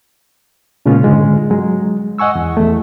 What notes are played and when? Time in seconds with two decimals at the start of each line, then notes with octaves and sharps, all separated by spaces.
0.86 A#2 C#3 G#3 B3 C#4 F4
1.04 G#2 D3 G#3
1.50 F#3 G#3
2.18 D#5 F#5 G#5 C#6 E6
2.35 E2
2.57 E2 A3